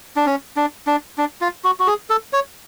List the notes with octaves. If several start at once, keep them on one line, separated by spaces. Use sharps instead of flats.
D4
C#4
D4
D4
D4
F4
F#4
F#4
G#4
A4
C#5